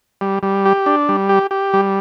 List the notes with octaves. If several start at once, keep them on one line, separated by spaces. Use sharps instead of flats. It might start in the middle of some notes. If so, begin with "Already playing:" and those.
G3
G3
G4
D4
G3
G4
G4
G3